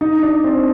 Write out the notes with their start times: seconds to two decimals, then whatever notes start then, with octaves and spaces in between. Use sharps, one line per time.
0.01 D#4
0.23 D4
0.44 C4